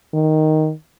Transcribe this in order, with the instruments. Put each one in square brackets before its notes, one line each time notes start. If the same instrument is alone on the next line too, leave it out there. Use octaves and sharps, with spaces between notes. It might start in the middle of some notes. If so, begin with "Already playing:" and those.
[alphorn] D#3